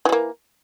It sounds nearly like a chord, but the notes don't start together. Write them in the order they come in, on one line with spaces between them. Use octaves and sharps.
E3 G3 A#3